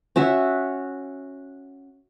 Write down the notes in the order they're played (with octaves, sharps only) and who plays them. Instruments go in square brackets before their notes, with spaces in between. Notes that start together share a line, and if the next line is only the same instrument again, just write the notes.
[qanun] C#4 F#4 E5